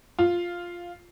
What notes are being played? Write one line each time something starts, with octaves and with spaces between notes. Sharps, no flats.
F4